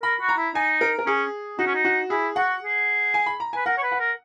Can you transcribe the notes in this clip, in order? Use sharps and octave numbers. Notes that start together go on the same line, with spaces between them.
A#4 B5
F#4
A#5
E4
D#4 G#5
A#4
A#4
C#4 G#4
D#4 F#4
C#4
D#4
F#4
E4 G#4
F#4 F#5
G#4
G#5
B5
A#5
B4 G#5
A#4 F#5
C#5
B4
F#5
A#4